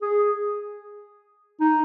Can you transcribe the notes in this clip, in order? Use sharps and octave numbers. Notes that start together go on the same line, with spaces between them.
G#4
D#4